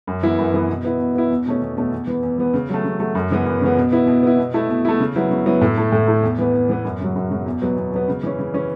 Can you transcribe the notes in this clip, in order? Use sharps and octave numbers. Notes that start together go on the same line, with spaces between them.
F#2
E3 B3 E4
F#2
E3 B3 E4
B2
B3 E4
B2
B3 E4
E2
B2 A3 C#4
E2
B2 A3 C#4
E2
E3 B3
E2
E3 B3
C#3
F#3 A3
C#3
F#3 A3
F#2
C#3 E3 B3
F#2
C#3 E3 B3
B2
B3 E4
B2
B3 E4
B2
A3 E4
B2
A3 E4
C#3
F#3 B3 E4
C#3
F#3 B3 E4
A2
A3 E4
A2
A3 E4
E2
E3 B3
E2
E3 B3
F#2
C#3 F#3
F#2
C#3 F#3
E2
B2 F#3 B3
E2
B2 F#3 B3
C#3
E3 C#4
C#3
E3 C#4